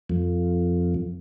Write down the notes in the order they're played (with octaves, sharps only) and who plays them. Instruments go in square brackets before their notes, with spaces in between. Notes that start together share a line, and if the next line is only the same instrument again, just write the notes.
[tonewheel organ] F2